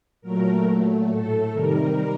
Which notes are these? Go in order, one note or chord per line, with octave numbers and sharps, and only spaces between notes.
A#2 F#3 A3 A#4
A#2 F#3 A3
A2 A3 A4
C3 D#3 G3 A#4